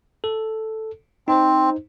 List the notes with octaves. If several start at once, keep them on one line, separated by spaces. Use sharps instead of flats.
A4
C4 D#4 C5